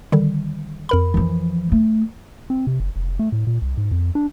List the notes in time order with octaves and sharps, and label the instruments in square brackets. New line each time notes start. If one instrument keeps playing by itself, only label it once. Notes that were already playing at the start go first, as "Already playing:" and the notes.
[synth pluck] D3 D#3 G3
F2 A#4 B5
[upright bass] E3 F3
A3
[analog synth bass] C4
C3
F#1
F1
A3
A2
A#2
C2
G#2
F2
D4